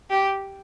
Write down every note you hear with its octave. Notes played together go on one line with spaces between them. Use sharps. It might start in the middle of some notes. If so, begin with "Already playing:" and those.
G4